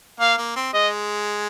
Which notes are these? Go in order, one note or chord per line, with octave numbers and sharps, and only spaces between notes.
A#3 F5
A#3
C4
G#3 D#5